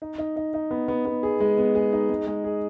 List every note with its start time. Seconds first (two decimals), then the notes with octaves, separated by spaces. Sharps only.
0.02 D#4
0.18 D#4
0.36 D#4
0.54 D#4
0.71 B3
0.88 B3
1.05 B3
1.23 G#4
1.40 G#3
1.58 B3
1.75 G#4
1.93 D#4
2.09 G#3
2.27 G#3
2.44 G#4